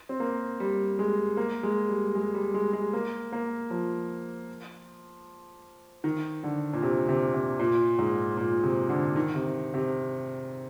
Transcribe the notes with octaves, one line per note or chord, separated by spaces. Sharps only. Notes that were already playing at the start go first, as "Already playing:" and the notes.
C4
A#3
G3
G#3
A#3
G#3
G3
G#3
G3
G#3
G#3
A#3
A#3
F3
D#3
D3
A#2
C3
C3
C3
A#2
G#2
A#2
C3
D3
D#3
C3
C3